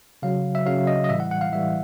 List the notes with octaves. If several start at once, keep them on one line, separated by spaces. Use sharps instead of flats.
C#3 F#3 F5
E5
C#3 F#3 F5
D#5
D#5
A2 E3 G3 E5
F#5
F#5
F5
A2 E3 G3 E5